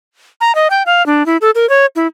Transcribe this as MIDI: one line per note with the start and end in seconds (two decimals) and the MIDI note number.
0.40 0.54 82
0.55 0.68 75
0.70 0.83 79
0.86 1.05 77
1.06 1.25 62
1.26 1.37 64
1.41 1.50 69
1.55 1.68 70
1.69 1.86 73
1.96 2.07 64